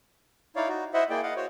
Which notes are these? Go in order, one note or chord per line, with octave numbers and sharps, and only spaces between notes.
D#4 E4 C#5 D5 F5
D#4 F#4
E4 C5 D#5 E5 F#5
A#3 E4 G#4 D5 G5
D#5 F5 F#5
F#4 C5 C#5